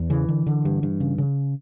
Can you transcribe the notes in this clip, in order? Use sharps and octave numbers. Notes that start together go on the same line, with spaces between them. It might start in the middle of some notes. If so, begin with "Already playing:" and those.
Already playing: E2
C#3 E3
D3
D3
G2
G2
C#3
C#3